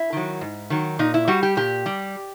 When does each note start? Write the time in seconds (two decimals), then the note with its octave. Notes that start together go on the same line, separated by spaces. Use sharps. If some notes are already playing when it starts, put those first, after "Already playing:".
Already playing: E4
0.13 D#3 F#3
0.41 G#2
0.70 D#3 F#3
0.99 A#2 D#4
1.14 E4
1.28 G3 F#4
1.43 G4
1.57 A#2 G4
1.86 G3